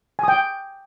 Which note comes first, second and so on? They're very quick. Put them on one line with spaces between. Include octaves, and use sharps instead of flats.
G#5 D#6 G5